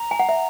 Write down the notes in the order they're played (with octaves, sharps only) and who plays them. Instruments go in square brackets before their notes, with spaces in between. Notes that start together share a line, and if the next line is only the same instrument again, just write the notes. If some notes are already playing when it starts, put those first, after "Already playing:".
Already playing: [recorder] A#5
[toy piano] G#5
F#5
E5